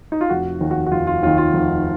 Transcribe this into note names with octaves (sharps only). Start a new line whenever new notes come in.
D#4
F4
F1 F#4
D#2 D#3
F#4
F#4
F1 F4
F4
D#2 D#3 F4
F4
F1